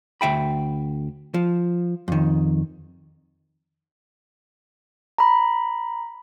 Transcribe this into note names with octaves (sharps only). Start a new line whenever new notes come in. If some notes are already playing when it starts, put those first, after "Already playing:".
D2 E5 G5 B5
F3
F2 D#3
A#5 B5